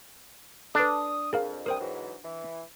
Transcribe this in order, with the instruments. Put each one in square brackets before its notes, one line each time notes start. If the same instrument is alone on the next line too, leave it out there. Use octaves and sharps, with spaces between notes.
[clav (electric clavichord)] D4 [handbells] A4 B4 [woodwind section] D#6
[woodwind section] F2 [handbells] G#4 A#4 F5
[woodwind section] C2 D#6 [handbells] A#4 C5 G5
[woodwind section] G#2 E3 F#3
E3